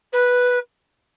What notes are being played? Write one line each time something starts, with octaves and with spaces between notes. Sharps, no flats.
B4